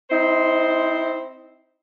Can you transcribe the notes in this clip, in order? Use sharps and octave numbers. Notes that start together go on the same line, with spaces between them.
C4 D#4 E4 C5